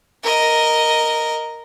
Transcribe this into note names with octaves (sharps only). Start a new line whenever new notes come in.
A#4 D#5